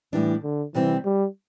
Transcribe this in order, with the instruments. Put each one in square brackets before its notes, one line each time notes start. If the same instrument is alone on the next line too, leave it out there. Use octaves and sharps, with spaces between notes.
[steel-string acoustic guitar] A2 G3 D4 [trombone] E3
[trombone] D3
[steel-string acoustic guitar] C3 G3 C4 [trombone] E3
[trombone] G3